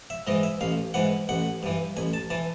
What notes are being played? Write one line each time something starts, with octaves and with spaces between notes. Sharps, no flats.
E5
G#2 E3 D#5
E5
A1 F5
G#2 E3 F#5
A1 F#5
G2 E3
A1 G#5
A5
E3 A5